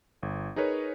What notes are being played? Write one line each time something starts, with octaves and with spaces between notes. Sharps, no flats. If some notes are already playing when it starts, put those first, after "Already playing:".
G1
D#4 G#4 A#4 B4 C#5